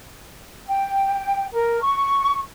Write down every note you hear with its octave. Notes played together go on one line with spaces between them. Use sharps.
G5
A#4
C#6